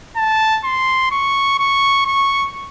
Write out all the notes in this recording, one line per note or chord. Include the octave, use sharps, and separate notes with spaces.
A5
C6
C#6
C#6
C#6